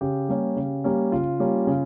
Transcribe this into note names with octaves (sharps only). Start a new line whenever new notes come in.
C#3 G4
G3 A#3 C#4
C#3
G3 A#3 C#4
C#3 F4
G3 A#3 C#4
C#3